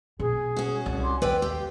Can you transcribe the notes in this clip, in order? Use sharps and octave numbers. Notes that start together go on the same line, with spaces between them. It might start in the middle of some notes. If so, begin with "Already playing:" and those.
B2 G#4
C#4 F#4
C2
C6 D6
D#2 B4 D5 G5 E6
G4 F5